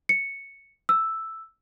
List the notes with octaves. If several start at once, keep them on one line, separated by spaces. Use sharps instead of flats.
C#7
E6